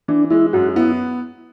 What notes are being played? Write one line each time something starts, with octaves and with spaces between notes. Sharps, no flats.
E3 D4
G#3 E4
F#2 F#4
B3 E4